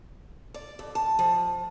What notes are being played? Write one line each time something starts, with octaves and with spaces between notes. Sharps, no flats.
D5
F2
A5
F3